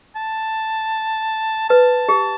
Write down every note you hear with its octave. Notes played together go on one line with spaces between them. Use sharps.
A5
B4 A5
G4